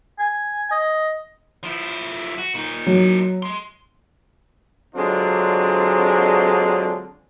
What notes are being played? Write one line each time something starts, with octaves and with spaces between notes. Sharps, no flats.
G#5
D#5
F3 E4
F#4
A#2 D#4
F#3
G#3 C6
D3 F#3 G#3 C4 D4 F4